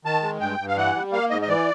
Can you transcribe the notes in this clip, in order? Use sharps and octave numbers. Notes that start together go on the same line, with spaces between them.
D#3 A5
G#3
G2 G5
G2
F5
E3 F#5
G3
A#3 F5
G#2 D#5
D#5
E3 D5